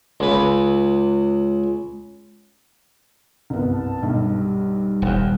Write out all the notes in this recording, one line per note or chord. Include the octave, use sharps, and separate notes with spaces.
C#2 B4
C2 G2 B3
A5
B1 G2 G3
D#1 D#2